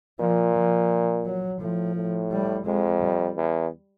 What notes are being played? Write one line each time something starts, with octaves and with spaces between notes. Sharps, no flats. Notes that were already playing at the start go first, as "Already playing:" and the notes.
A#2 F3
F3
F#3
A2 F3
A2
G3
F2 G#3
G3
E2